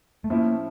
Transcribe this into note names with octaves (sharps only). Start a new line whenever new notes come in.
A3
A2 F3 A#3 C#4 E4